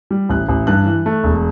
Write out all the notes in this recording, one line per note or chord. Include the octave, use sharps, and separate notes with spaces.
G3
A1 F#6
A1
G2 F#6
E3
A3
E1